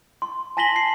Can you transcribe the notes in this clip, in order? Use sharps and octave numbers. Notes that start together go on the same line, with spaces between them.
C6
G#5 A5 A#6 B6 F#7 G7
C7